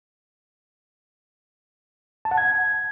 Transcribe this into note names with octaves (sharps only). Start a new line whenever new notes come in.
A5
F#5
G#6